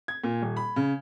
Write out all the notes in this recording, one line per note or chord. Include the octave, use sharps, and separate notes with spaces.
G#6
A#2
D#1
B5
C#3